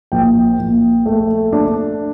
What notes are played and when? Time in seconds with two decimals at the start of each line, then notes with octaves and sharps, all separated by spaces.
0.12 A#1 G5
0.59 A#1
1.06 A3
1.53 D4